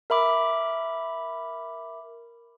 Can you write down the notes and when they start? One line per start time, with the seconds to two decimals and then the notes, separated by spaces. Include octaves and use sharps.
0.10 A#4 E5 B5 D6